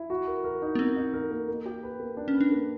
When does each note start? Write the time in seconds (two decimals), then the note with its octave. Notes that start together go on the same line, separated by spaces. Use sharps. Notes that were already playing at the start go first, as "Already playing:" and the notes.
Already playing: E4
0.10 F#4
0.27 A#4
0.44 A#4
0.62 D#4
0.75 B3
0.79 C4 A#4
0.96 D#4
1.13 A#4
1.31 A#3
1.48 A#3
1.66 G4
1.83 B4
2.00 A#3
2.17 D4
2.28 C#4
2.34 B4
2.41 D4
2.52 A#3